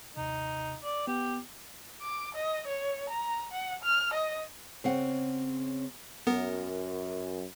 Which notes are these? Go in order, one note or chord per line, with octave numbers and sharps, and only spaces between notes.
G#1 D#2 C3 D#4
D5
B3 G4
D6
D#5
C#5
A#5
F#5
F6
D#5
C#3 C4 F#5
F#2 B3 A#4